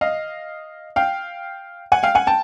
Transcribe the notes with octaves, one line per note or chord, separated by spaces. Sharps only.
D#5 F5
F5 G5
F#5 G#5
F5 G5
F#5 G#5
G5 A5